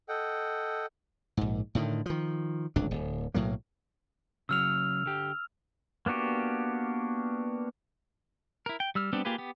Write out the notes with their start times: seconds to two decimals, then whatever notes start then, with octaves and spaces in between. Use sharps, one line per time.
0.09 A4 D#5 F#5 G5
1.37 A#1 G#2
1.75 A2 D3 D#3
2.06 D#3 F3
2.76 D1 G#1 C#2 D4
2.91 D1
3.34 B1 A2 F#3 A#3
4.49 C#3 F#3 E6 F6 F7
5.06 D3 G4
6.06 A#3 B3 D4 F#4 G4
8.66 E4 A#4
8.80 G5
8.95 G3 E6 F6
9.13 G3 B3 C4 D4 G4
9.25 A#3 F4 G4 G#4 B4
9.38 B3 G4